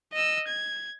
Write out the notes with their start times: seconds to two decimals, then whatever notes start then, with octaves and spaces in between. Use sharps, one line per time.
0.13 D#5 E6
0.47 G#6